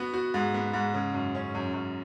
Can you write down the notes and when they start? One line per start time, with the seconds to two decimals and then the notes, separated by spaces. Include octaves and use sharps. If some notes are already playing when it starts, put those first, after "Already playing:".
Already playing: B3 F#4
0.14 F#4
0.34 G#2
0.54 B3
0.74 G#2
0.94 C#3
1.14 F#2
1.35 C#4
1.55 F#2
1.74 F#2